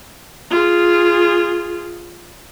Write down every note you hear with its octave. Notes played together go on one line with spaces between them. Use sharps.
F4 G#4